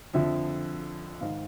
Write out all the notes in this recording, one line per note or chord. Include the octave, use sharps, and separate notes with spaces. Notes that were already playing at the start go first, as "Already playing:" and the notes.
F2 D3 F3 E5
G#2 D#3 F5